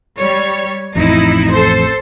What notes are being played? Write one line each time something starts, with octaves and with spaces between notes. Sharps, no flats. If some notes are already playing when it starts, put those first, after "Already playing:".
G3 C#5
A1 F2 D#4 E4
A4 C5